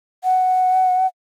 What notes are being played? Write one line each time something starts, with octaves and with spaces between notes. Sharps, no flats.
F#5